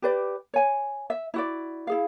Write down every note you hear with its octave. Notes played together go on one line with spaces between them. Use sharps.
G4 B4 D5
C#5 G#5
E5
E4 F#4 D5
E4 G#4 F5